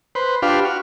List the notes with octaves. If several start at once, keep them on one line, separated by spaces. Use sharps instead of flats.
B4 C5
D4 F4 G4 B4 F5
F#4 F6